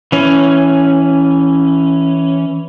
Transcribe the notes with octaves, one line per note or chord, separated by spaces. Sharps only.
E3 C#4